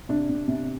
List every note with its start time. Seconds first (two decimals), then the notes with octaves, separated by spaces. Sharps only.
0.09 C3 D4
0.29 C3
0.48 C3